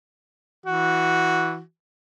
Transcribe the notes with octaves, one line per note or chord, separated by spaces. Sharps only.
E3 F#4